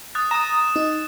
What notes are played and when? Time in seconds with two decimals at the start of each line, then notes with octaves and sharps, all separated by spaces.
0.15 D#6 F#6 A6
0.31 A#5 D#6 E7
0.76 D#4